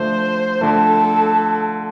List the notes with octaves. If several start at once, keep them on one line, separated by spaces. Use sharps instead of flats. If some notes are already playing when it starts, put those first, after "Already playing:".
Already playing: D3 F3 A3 C5
D3 F3 A3 A4